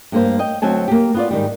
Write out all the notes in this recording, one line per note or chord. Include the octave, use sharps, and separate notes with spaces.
G2 A#3 C5
D#5 G5
D2 F#3 C4 G#5 A5
A#3 G4
B3 F4 D5
G#2 D#3 G3